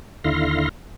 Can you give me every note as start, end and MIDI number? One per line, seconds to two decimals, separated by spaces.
0.24 0.69 39
0.24 0.69 50
0.24 0.69 64
0.24 0.69 77
0.24 0.69 84
0.24 0.69 94